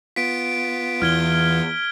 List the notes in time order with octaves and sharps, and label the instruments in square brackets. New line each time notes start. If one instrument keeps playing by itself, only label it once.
[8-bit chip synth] B3 F4 [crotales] B6 D7
[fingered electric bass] E2 E3 [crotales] F6 G#6 G7